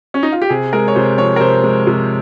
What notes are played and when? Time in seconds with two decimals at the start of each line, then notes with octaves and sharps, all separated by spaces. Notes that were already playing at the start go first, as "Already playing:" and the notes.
0.14 C#4
0.23 D#4
0.32 F4
0.42 G4
0.49 C3 G#4
0.73 G#3 A#4
0.88 C#5
0.95 C3 C5
1.18 F3 C#5
1.36 A#4
1.41 C3 C5
1.64 G#3
1.87 C3